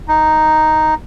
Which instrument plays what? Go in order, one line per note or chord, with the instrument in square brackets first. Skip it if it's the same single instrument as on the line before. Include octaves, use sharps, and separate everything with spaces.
[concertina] D#4